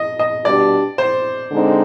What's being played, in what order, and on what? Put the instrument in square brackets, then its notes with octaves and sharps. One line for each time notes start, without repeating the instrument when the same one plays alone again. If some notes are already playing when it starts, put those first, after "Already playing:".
Already playing: [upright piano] D#5
D#5
[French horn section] B2 G3 D4 G4 [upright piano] D5
[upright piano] C5
[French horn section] D3 G#3 C4 D#4